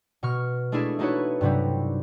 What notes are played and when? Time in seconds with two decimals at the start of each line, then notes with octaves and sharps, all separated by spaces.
0.23 B2 C#6 F6
0.72 G#3 A3 D4 E4 G#4 A4
0.99 A3 D#4 E4 F#4 B4 C#5
1.41 G2 C3 F#3 G3